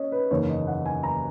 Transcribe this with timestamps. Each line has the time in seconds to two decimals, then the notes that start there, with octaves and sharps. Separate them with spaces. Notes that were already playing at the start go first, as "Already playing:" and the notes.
Already playing: C#4 C#5 D#5
0.12 B4
0.31 F#1 E2 D#3 A#3 C#5
0.49 D#5
0.67 F#5
0.86 G#5
1.03 A#5